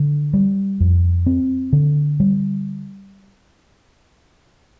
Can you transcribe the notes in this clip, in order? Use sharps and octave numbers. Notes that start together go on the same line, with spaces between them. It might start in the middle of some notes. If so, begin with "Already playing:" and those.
Already playing: D3
G3
F2
C4
D3
G3